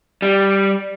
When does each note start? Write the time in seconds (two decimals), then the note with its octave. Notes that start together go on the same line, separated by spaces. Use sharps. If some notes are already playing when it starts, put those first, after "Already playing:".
0.22 G3